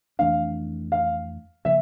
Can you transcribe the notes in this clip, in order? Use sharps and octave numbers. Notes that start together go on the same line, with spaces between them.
F2 E3 A3 D4 F5
F5
C#3 F3 A#3 E5